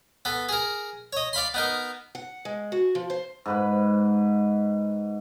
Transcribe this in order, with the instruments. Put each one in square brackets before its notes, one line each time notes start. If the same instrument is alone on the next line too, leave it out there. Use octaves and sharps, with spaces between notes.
[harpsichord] B3 A4
G#4 A#4
C#5 D#5
D5 F5 B5 C6
B3 D#4 A#4
[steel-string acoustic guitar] F#5
G#3
F#4
F3
C5
[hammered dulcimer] G#2 B4 D6